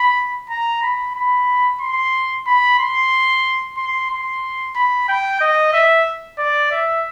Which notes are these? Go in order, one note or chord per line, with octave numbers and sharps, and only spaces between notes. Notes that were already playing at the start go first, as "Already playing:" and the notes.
Already playing: B5
A#5
B5
B5
C6
B5
C6
C6
C6
B5
G5
D#5
E5
D5
E5